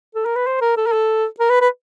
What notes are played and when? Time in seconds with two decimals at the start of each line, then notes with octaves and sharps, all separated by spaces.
0.15 A4
0.25 A#4
0.36 B4
0.46 C5
0.61 A#4
0.77 A4
0.86 A#4
0.92 A4
1.40 A#4
1.50 B4
1.61 B4